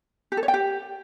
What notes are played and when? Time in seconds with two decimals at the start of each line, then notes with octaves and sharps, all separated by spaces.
0.32 G4
0.37 A4
0.43 C#5
0.48 G5
0.54 G4